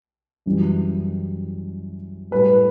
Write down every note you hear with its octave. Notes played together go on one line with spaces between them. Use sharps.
F#2 E3 G3
A2 G3 B4